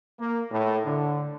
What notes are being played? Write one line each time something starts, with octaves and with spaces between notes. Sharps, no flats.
A#3
A2
D3